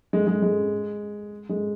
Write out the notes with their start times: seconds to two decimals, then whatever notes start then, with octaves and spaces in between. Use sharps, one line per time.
0.13 G#3
0.27 G#3
0.42 G#3
1.49 G#3